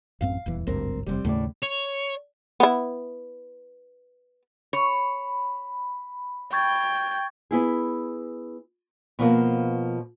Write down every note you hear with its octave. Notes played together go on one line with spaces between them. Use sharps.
A1 F#2 C4 F5
D#1 E2 E3
G#1 D2 G2 C4 A#4
E1 C3 G3 C4
D#2 A2 C#3 A3 D5
C#5
B3 E4
C#5 B5
G5 C#6 G#6 A6
B3 E4 G#4
B2 F3 A#3